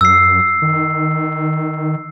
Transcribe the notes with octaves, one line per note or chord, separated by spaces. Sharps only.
F#2 E6 C7
D#3